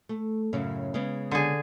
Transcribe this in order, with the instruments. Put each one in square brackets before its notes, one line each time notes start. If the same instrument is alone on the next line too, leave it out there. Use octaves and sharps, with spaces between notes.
[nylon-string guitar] A3
F#2 A2 C#3
C#3 G#3 B3
[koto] D3 G#4